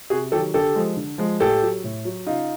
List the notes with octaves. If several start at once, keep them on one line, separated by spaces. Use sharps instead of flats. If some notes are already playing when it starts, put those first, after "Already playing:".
C3 F#4 G#4
D#3 F#3 G4 A4
D3 G4 A4
F3 G#3
D3
F3 G#3
A2 G4 A4
F#3
A2
F#3
C#3 D#4 F4